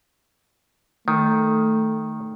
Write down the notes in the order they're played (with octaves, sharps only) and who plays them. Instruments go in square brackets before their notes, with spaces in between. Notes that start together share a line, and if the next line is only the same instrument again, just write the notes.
[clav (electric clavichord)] D#3 [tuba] A3